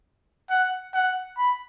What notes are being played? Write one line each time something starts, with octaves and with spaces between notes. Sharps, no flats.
F#5
F#5
B5